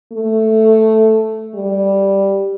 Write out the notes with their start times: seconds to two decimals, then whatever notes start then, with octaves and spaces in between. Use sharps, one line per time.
0.13 A3
1.55 G3